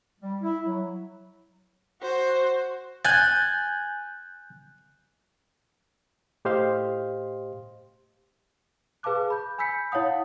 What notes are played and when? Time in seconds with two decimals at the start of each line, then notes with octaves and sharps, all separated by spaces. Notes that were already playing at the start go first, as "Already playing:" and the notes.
0.21 G3
0.42 E4
0.64 F#3
2.01 F#4 C5
3.05 G#5 F#6 G6 A6
6.45 A2 G4 C5 D#5 F5 C6
9.03 G#4 B4 F5 A5 D6 F#6
9.30 B5 G6
9.58 G#5 B5 E6 G6 B6 C#7
9.92 E4 C#5 F5 F#5 D#6